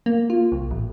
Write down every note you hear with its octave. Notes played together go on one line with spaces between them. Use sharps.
A#3
F4
C2
A1